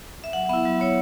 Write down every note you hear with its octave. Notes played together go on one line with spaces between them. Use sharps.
E5
F#3 F#5
B3 E4 E5
F#3
B3 E4 C#5